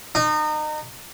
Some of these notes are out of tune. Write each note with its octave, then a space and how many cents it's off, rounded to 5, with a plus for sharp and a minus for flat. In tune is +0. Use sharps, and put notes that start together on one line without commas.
D#4 -30